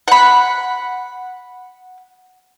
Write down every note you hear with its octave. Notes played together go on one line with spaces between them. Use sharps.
F#5 B5